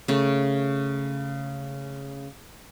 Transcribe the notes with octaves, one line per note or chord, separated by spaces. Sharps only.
C#3 A3